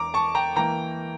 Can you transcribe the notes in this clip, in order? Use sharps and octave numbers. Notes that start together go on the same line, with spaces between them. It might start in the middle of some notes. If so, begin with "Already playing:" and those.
Already playing: E2 A#5 D6
A5 C#6
G5 A#5
E3 A#3 G5 A#5